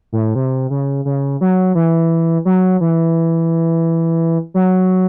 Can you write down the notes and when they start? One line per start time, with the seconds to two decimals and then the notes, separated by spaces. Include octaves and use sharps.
0.13 A2
0.35 C3
0.70 C#3
1.05 C#3
1.41 F#3
1.75 E3
2.45 F#3
2.81 E3
4.54 F#3